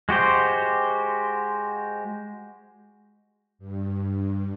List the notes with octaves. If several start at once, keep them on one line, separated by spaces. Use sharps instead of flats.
G#3 F#4 G4 C5
G2